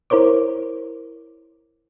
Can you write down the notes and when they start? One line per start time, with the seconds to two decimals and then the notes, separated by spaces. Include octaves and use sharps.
0.10 E4 A#4 C5 C#5 D6